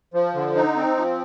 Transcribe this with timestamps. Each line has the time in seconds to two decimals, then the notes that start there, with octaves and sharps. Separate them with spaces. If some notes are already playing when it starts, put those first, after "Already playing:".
0.14 F3
0.35 D3
0.55 D#4
0.76 C4
0.97 F3